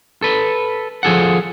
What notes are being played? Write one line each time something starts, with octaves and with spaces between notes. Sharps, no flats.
A4 B4
F3 G#4 A4 F#5